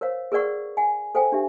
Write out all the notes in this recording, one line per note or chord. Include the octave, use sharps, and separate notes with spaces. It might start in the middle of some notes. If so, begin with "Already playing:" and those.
A#4 C5 C#5 F5
G#4 A#4 B4 D5 F#5 C#6
F#5 G#5
A4 C5 F5 G5 G#5
D4 G4 E5